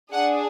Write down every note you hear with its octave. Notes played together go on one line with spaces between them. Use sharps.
D4 G#4 F#5